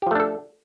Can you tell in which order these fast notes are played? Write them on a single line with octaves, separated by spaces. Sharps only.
G4 F3 A3 D4 A4